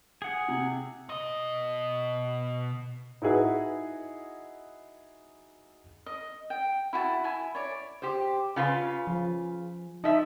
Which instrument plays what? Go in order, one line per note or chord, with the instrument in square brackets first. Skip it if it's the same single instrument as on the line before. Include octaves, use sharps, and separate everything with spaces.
[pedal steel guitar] G#4 F#5
[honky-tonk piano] C3
[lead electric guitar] B2 D#5
[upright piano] D#4 E4 F#4 G#4 B4
[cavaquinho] D#5
G5
E4 F#4 G5 A5
E4 G#5
C#5 D5
[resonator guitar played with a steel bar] G4 C5
C#3 F4 B4
[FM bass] F3
[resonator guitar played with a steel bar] F3 E5 [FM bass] D#4